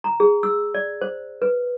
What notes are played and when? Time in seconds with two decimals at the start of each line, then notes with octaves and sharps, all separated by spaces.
0.04 A#5
0.20 G#4
0.43 E6
0.74 D5
1.01 C5
1.42 B4